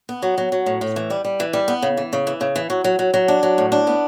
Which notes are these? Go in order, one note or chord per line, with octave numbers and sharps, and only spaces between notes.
B3
F#3
F#3
F#3
A2
A2
E3
G3
G3
E3
G3
B3
C#3
E3
C#3
E3
C#3
E3
F#3
F#3
F#3
F#3
D4
F#3
A2
D4
B3